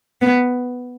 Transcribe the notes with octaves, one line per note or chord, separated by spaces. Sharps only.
B3